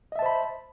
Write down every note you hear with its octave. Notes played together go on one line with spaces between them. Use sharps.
C5 D#5 E5 A5 B5